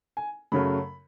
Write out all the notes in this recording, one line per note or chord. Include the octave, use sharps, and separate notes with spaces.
G#5
F#2 C#3 F#3 A3 B5